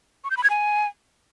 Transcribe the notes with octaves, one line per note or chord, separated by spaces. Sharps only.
C#6
G6
B5
G#6
G#5